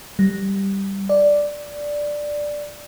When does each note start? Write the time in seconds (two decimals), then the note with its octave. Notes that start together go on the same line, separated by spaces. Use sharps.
0.19 G3
1.09 D5